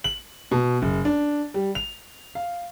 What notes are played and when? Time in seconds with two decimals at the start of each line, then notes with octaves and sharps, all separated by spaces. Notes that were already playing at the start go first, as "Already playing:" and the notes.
0.04 F#7
0.51 B2
0.82 F#1
1.05 D4
1.54 G3
1.75 F7
2.35 F5